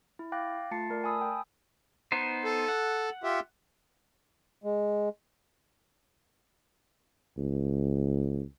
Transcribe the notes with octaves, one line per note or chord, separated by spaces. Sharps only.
E4
F5 G5 D6 F#6 A6 A#6
A3 F4 A5 A6 C7 C#7
A3 A#4 D5
G#5 A5 B5 D#6 E6
G5
B3 D#4 C5
A4
F#5
F4 G4 E5
G#3
C#2